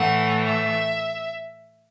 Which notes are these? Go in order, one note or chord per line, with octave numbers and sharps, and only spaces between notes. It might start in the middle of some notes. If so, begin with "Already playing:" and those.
Already playing: A2 E3 A3 F#5
E5